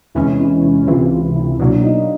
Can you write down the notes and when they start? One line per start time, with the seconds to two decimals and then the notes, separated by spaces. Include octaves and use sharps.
0.15 E2 C3 E3 G#3 C#4 E4
0.40 E4
0.63 E4
0.87 C#2 C3 E3 F4
1.12 F4
1.35 E4
1.59 B2 F#3 A#3 D4
1.83 D#4